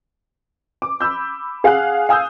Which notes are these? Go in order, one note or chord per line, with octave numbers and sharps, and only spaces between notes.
D6
B5 E6 G6
G#4 F5 F#5 G#5 F#6
F5 G#5 D#6 E6 G6